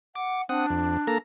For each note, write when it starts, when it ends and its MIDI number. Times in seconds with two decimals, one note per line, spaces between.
0.15 0.43 78
0.15 0.42 86
0.49 0.66 60
0.49 1.14 62
0.49 0.66 78
0.49 0.66 87
0.70 0.97 41
1.07 1.18 58
1.07 1.18 69
1.07 1.18 82